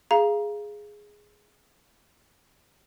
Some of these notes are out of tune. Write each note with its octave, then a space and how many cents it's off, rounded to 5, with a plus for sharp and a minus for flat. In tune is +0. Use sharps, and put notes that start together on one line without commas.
G#4 +0 F5 -15 A#5 +15